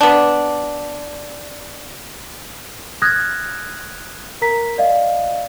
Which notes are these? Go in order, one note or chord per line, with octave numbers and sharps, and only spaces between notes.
B3 D4
D#6 F6 F#6 G#6 A#6
A#4 A#5 B6
D5 D#5 F5